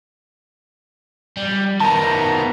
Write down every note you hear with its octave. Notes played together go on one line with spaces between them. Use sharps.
G3
D#3 B3 A5 A#5